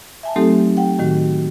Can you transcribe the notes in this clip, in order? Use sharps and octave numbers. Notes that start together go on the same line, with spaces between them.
E5 G#5 A5
F#3 A3 C4 D#4 G4 A4
F#5 G5
A2 D#3 F#4